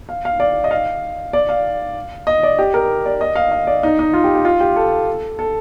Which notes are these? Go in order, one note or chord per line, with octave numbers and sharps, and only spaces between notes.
F5
F5
D5
D#5
F5
D5
F5
D#5
D5
G4
A#4
D5
D#5
F5
D#5
D5
D#4
D#4
F4
G4
G4
F4
G4
A4
A4